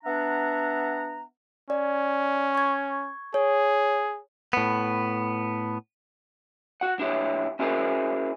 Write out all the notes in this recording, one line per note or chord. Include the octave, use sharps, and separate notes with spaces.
B3 D4 E5 F#5 A#5
C#4 D5
C#6 G#6
G#4 C#5
A2 B3
F#4 F#5
B1 D4 E4 G4 C#5
C#4 E4 F#4 G#4 A#4 C5